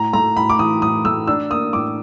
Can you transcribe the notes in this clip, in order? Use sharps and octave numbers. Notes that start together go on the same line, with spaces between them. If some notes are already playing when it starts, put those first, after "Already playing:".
Already playing: A2 A#5
A3 A#5
A2 B5
D6
E3 D#6
A2 D#6
A3 E6
D4 E6
A#3 D#6
A2 D6